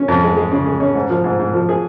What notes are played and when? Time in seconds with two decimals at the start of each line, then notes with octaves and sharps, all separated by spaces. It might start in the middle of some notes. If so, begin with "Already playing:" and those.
Already playing: C#4
0.08 F2
0.23 G#3
0.36 G#3
0.52 C#3
0.66 G#3
0.80 C#4
0.95 G#2
1.10 F3
1.24 G#2
1.39 G#2
1.54 F3
1.69 G#4